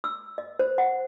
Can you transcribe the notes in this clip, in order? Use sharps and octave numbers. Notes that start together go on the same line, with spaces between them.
E6
D#5
C5
F#5